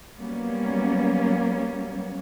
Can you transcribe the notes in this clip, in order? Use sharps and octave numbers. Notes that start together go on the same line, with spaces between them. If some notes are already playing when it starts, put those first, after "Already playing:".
F#3 G3 A#3 B3 C#4